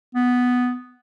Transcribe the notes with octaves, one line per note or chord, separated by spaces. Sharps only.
B3